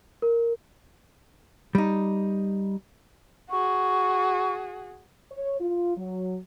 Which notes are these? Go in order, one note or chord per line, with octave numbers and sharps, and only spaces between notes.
A#4
G3 D#4
F#4 G#4 C#6
C#5
F4
F#3